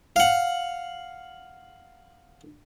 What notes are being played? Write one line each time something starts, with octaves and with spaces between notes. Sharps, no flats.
F5 F#5